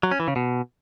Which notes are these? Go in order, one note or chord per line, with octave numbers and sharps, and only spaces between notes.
F#3
C#4
E3
C#3
B2